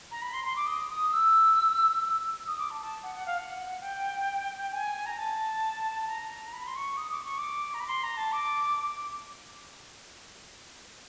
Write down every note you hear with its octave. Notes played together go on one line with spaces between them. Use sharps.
A#5
B5
C6
C6
D6
D#6
D#6
E6
D#6
D6
A5
A5
F#5
F#5
F5
F#5
G5
G#5
A#5
A5
A#5
A#5
B5
C6
C#6
D#6
D6
C#6
D6
A#5
B5
C6
A#5
A5
D6